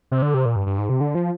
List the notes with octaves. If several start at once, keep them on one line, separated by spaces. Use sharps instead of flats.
C3
D3
C3
A#2
G2
G2
G#2
C3
D3
F3